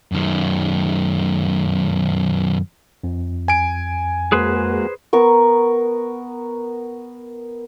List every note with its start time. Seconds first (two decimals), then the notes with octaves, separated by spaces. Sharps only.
0.12 F#2 D#3
3.04 F2
3.48 G#5 D7
4.32 G#3 A#3 F#4 G#4 B4 C5
5.13 B3 A#4 C#6